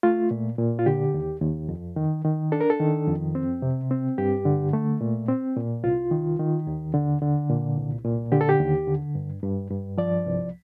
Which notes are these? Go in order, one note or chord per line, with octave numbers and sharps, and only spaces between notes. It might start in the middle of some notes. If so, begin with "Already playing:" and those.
A3 F4
A#2
A#2
F4
D3 G4
D#2
D#2
F2
D#3
D#3
D4 A4
A#4
A4
D#3
F2
C4
C3
C4
G2 G4
D3
A3
A#2
C4
A#2
C2 F4
D#3
D#3
D#2
D3
D3
A#2
C2
A#2
D3 G4
A4
G4
D#2
D3
G2
G2
G2
F3 D5
C2